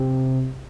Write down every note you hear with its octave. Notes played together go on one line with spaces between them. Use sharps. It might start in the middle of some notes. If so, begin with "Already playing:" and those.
Already playing: C3